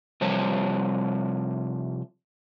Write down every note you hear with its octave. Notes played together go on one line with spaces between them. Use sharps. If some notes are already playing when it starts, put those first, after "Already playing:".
C3 F3 G3 C5 C#5 A5